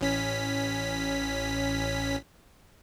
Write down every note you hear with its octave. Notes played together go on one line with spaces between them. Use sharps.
A1 C#4 B6